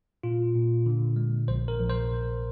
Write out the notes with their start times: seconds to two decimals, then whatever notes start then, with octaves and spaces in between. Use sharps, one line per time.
0.23 A#2 F4
0.55 A#2
0.86 D3
1.16 G#3
1.48 A#1 C5
1.68 A#4
1.79 A#1
1.90 C5